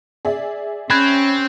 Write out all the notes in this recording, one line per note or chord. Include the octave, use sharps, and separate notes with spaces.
G#4 D5 E5
C4 C#4 B5 F#6 G#6